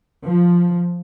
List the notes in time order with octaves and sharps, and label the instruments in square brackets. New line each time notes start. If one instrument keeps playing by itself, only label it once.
[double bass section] F3